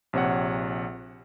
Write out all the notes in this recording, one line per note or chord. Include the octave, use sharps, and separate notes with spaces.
A#1 C3 C#5 F#5